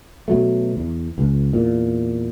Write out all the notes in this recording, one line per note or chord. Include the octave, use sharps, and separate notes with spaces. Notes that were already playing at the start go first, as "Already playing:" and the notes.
B2 F#3 A3
E2
C#2
E2 A#2